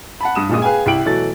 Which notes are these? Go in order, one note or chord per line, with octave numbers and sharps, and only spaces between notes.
F#5 A5 B5
G2 D#6 E7
D#1 A#1 A#2 G#3 D#6
G#4 B4 F5 G5 G#5
C2 E4 G5 D7 F#7
B2 E3 F#3 A3 A4 A6